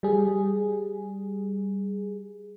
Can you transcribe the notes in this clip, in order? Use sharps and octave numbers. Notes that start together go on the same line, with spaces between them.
G3 G#4